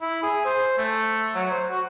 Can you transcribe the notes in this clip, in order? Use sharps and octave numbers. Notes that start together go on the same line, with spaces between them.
E4
G#4
C5
A3
F#3
C5
F#4